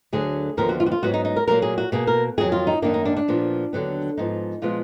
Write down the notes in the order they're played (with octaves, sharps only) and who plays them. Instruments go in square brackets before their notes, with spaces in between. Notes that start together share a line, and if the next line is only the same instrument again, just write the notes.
[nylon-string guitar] D2 D3 F#3 G#4
D#2 D3 F3 B3 A#4
F#4
F4
F#4
F4
G#2 F#3 B3 F#4
D#4
D#4
A#4
A#2 F#3 A#3 A#4
G#4
F#4
B2 A#3 G#4
A#4
F2 D#3 F#3 G#4
F4
D#4
F#2 D#3 A#3 D4
D#4
D4
D4
A#2 F3 B3
D#2 D3 F#3 B3
G#2 F3 B3 D#4
A#2 F3 G#3 B3 F4